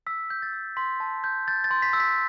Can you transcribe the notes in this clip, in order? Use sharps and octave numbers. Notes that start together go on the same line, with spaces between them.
E6 B6
G6
A6
E6
C6 B6
A5
G6
G6 A6
A6
C6
B6
E6
B6